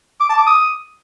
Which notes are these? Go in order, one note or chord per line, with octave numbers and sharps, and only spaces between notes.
D6
A5
D6
D#6